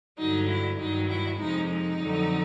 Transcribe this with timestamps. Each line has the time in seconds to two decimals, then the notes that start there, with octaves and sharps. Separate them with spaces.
0.18 G2 D3 F#3 D#4
0.48 E4
0.79 G2 D#3 F#3 D#4
1.09 E4
1.39 F2 C3 F3 G#3 D#4
1.69 D#4
1.99 F2 D3 F#3